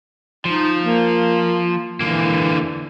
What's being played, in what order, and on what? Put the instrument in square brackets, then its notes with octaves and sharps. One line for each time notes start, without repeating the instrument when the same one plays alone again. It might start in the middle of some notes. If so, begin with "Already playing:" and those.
[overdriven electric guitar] F3 [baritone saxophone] D#4
[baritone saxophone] A#3
[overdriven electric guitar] D3 A#3 [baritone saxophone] E3